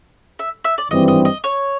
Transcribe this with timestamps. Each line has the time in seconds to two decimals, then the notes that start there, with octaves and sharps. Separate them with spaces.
0.39 E5
0.64 E5
0.78 D5
0.91 G#1 G2 E3 G3 C4 D#5
1.08 D#5
1.25 D#5
1.44 C#5